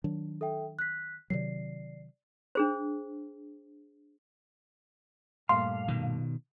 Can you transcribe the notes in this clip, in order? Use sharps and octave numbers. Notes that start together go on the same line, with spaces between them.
D#3 F#3 D4
A4 E5 G5
F#6 B6
C3 D#3 F#3 D5 C7
D4 G#4 C5
G2 A#2 A3 F5 C6
B2 D#3